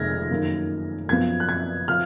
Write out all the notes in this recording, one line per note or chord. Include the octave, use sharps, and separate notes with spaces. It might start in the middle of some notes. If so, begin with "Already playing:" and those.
Already playing: F1 F2 D#3 G#3 F6 G#6 A#6
F#2 D#3 A#3
F#2 F3 B3 G#6
F#6
G#6
F3 F6